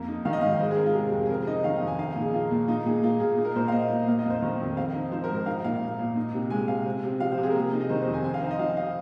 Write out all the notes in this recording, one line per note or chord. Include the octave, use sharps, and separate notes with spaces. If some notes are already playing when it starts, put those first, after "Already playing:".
Already playing: F2 A#3
D#4
D#3 F5
D#5
G#2 F5
D#5
G#3 C5
G#4
C4 A#4
F4
C3 G#4
F2
G#4
C4 A#4
D#4 D#5
D#3 F5
F2
G#5
D#4 F5
A#2
G#4
A#3 F4
A#2
D#4 F4
A#2 G#4
A#3 F4
A#2 G#4
D#4
A#4
A#2 C5
F5
A#3 D#5
A#2
A#3 F5
D#5
F2 C5
D#3
F2
C4 F5
D#4
F3 C5
A#4
G#2
A#4
D#4 F5
A#2 F5
A#3
A#2
D#4
C3
G#3 G#5
C3 F5
C4
C3
F3 F5
C5
C3
G#4
A#4
A#3 G#4
D#4
D#5
D#3 C5
C5
F2
G#5
C4 G#5
F5
D#4 C5
D#5
F3 F5
F5